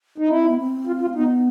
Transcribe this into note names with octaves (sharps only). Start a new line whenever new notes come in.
D#4
C4 E4
B3
C4
F4
F4
B3 D#4